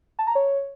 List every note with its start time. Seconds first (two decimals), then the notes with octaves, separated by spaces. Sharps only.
0.19 A5
0.27 A#5
0.35 C#5